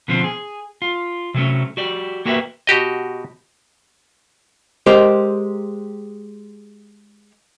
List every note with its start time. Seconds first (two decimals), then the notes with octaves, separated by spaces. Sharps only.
0.08 B2 D3 F3 C4
0.24 G#4
0.82 F4
1.34 C3 F#3 A3 C#4
1.77 F#4 G4 D5
2.25 A#3 F#4 G4 A#4 B4 E5
2.67 B2 F#4 G4 D#5
4.86 G#3 G4 A#4 C5